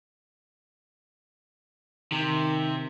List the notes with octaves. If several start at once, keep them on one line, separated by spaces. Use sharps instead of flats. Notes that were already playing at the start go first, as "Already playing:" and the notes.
C3 D#3